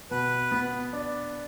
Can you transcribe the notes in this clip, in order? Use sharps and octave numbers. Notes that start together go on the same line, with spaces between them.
B2 B4
B3
D4